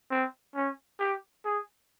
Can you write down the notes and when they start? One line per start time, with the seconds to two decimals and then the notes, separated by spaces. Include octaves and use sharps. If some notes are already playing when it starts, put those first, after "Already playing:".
0.11 C4
0.55 C#4
1.00 G4
1.45 G#4